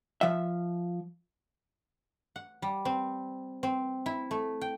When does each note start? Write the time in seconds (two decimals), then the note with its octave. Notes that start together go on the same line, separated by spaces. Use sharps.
0.21 F3 E5
2.36 F#5
2.62 G3
2.85 C4
3.63 C4
4.06 E4
4.31 A3
4.61 G5